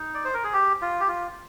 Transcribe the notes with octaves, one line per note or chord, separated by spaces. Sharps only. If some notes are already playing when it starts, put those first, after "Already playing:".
Already playing: D#4
D5
C5
A#4
G#4
G4
F4
G4
F4